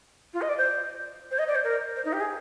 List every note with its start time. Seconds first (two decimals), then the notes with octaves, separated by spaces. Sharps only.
0.33 F4
0.42 D#5
0.49 D5
0.58 C5
1.31 C5
1.39 D#5
1.48 D5
1.55 C5
1.64 A#4
1.96 C5
2.05 D#4
2.13 G4
2.20 G#4